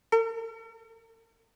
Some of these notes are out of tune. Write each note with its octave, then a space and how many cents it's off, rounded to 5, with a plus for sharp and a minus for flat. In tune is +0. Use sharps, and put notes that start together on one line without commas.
A#4 -45